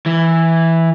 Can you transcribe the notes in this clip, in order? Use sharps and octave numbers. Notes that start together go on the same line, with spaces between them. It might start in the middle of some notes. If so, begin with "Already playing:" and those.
E3